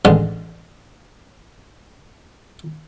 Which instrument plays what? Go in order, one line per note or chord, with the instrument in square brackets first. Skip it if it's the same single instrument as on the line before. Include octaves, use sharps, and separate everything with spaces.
[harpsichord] A1 D3 G#3